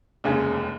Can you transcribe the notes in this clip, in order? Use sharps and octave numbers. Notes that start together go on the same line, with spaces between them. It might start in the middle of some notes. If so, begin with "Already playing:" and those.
F1 D#2 C#3 G#3 C#4